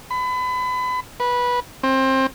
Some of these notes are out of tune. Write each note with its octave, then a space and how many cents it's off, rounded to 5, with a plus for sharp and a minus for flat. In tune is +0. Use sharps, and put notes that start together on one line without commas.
B5 +30
B4 -15
C4 +25